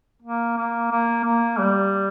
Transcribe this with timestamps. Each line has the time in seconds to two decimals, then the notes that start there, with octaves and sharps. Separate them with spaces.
0.22 A#3
0.57 A#3
0.91 A#3
1.24 A#3
1.59 G3